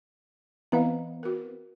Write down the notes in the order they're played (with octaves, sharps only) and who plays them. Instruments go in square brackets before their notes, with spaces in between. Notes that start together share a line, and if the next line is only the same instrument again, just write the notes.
[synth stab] E3 B3 C4 [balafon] D#5 F5 A#5
[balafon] F#4 A#4